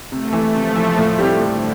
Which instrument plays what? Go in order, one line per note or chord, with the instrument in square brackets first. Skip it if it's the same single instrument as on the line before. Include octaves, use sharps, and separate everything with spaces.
[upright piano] C3 [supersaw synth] A3
[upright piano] E3 A3
[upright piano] C3 [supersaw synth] F3
[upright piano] E3 A3
A2
G3 C4 E4 G4
[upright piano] A2 [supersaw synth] D3